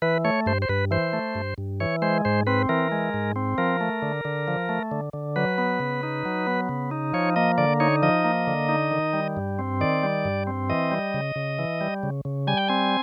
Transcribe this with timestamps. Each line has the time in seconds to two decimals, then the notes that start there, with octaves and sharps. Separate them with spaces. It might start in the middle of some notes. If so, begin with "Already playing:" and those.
0.02 E3 B4
0.25 A3 C#5
0.46 G2 C5
0.62 C5
0.69 G2 B4
0.91 E3 C5
1.13 A3
1.35 G2
1.58 G2
1.80 E3 C#5
2.02 G#3 C5
2.25 G#2 C5
2.47 C4 B4
2.69 E3 A#4
2.92 G#3
3.14 G#2
3.36 C4
3.58 F3 A#4
3.81 A3
4.02 D3
4.25 D3
4.48 F3
4.69 A3
4.91 D3
5.13 D3
5.36 F#3 B4
5.58 B3
5.80 C#3
6.03 D#4
6.25 F#3
6.47 B3
6.69 C#3
6.91 D#4
7.13 F3 C#5
7.36 A#3 D#5
7.58 D3 D5
7.80 D#4 C#5
8.02 F3 D#5
8.25 A#3
8.47 D3
8.69 D#4
8.91 D#3
9.13 G3
9.37 G2
9.59 C4
9.81 D#3 D5
10.03 G3
10.25 G2
10.47 C4
10.70 E3 D#5
10.92 G3
11.14 C#3
11.36 C#3
11.59 E3
11.81 G3
12.03 C#3
12.25 C#3
12.47 G3 G#5
12.57 G5
12.68 C4 G#5